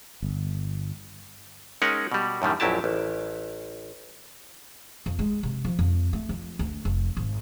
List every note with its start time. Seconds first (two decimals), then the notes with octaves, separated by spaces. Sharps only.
0.22 G1
1.82 G#3 C#4 D#4 A#4 F#5
2.12 B2 G3
2.42 F#2 A2 D#3 G3
2.60 A#1 F#2 F#3 E4 G4 A5
2.84 A1
5.06 F2
5.19 G#3
5.43 C3
5.65 F3
5.79 F2
6.13 A3
6.29 F2
6.59 D2
6.85 F1
7.17 G#1